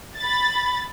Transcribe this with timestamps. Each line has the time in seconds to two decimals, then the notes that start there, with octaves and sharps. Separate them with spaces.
0.18 B5 A6